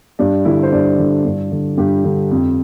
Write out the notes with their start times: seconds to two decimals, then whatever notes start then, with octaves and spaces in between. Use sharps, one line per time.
0.19 G2 D4
0.45 D3 E4
0.63 C5
0.72 G2 D5
0.99 D3
1.25 G2
1.52 D3
1.77 G2 G4
2.04 D3
2.31 F2